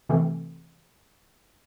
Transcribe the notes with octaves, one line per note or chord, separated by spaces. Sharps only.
C3 E3 A3 C4 A4